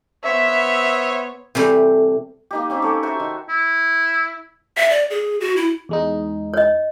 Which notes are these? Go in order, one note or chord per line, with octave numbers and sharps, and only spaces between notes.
B3 C5 C#5 E5
C3 E3 G3 A3
A#3 D#4 G4
C4 C#4 D#4 G4
A4 C#5 G5
F#4 C5 E5 C#6
D#3
E4
E5
D5
G#4
F#4
E4
E2 G#3 D#4
C#5 D#5